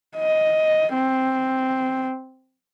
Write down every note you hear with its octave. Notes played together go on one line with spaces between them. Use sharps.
D#5
C4